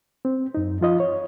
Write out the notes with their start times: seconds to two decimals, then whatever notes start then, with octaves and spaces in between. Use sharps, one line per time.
0.25 C4
0.55 F#2 D#4
0.81 F3 F4 D#5
1.00 C#5